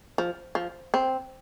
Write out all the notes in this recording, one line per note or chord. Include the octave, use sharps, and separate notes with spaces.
F3
F3
C4